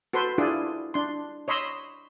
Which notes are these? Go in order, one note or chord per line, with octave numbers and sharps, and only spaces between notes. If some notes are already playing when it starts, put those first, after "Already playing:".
F#4 A4 B4 C5 C6
D4 E4 F4 G#4 A4 D5
D4 C6
C#5 D#5 B5 C6 E6